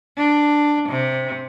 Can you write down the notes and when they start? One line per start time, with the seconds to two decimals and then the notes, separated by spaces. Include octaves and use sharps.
0.17 D4
0.89 C3